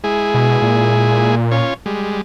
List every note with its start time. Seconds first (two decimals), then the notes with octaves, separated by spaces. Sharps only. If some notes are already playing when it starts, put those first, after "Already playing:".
0.04 G#3 E4 G#4
0.34 B2
0.62 A#2
1.51 C#4 F4 C#5
1.86 G3 G#3